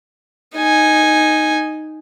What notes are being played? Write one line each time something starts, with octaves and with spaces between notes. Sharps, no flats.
D#4 G#5